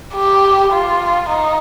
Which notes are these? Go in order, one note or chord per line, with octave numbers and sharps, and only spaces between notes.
G4
F4
D#4